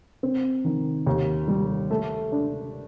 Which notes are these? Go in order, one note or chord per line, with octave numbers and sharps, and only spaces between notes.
C4
D#3
D#2
G3
A3
D4